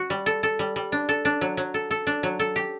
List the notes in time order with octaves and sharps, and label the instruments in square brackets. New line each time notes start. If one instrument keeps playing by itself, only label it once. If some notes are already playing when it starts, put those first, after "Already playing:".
Already playing: [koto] F#4
G3
A4
A4
G3
G3
D4
A4
D4
F#3
F#3
A4
A4
D4
F#3
A4
G4